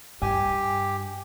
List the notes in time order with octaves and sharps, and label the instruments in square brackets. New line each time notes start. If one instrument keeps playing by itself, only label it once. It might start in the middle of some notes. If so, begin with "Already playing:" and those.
[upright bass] G2 [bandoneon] G4 [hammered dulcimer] G#5